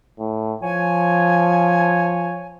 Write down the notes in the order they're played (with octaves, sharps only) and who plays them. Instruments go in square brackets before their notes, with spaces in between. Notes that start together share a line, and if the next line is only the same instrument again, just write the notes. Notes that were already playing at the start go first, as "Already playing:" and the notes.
[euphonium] A2
[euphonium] F3 [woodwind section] C#5 G#5